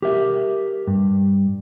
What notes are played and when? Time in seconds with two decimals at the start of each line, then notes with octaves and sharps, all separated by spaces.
0.02 G4 A#4 E5
0.87 G2